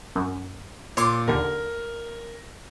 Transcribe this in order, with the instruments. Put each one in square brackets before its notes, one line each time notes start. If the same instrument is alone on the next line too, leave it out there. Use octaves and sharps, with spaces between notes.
[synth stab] F#2
[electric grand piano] A#2 [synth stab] C#5 C6 D6
[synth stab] D#2 D3 [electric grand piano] A#4